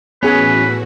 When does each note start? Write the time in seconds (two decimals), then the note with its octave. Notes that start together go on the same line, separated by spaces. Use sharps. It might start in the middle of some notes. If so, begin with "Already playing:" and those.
0.23 A2 E3 B3 C#4 F#4 G#4 B4 G#5